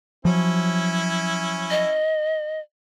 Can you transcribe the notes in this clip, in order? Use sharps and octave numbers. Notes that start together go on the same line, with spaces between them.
F3 F#3 C#4 E4
D#5